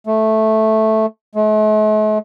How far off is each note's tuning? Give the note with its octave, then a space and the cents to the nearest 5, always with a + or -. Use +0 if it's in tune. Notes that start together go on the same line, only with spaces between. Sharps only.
A3 -5
A3 -45